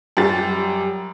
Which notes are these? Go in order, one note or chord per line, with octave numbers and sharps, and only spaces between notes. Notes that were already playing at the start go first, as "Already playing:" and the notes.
F#2 G3 G4 A6